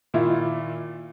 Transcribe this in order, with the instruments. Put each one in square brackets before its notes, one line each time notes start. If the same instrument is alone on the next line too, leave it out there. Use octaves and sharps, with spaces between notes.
[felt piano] A#2 D#3 E4 F4 E5